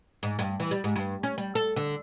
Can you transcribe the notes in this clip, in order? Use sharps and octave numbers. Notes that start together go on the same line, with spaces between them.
G#2
G2
E3
G3
G#2
G2
C#4
G3
A4
D3